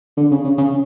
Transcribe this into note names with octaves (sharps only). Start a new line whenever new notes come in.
D3
C#3
C#3
C#3